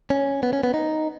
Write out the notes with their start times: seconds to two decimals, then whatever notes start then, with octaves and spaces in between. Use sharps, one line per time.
0.10 C#4
0.43 B3
0.53 C#4
0.63 B3
0.74 D#4